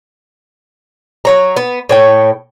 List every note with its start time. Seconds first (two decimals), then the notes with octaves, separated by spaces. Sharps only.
1.25 F#3 C#5 A#5
1.56 B3
1.89 A2 C#5 G5